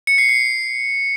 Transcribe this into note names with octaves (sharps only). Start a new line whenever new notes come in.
C#7
C7
C7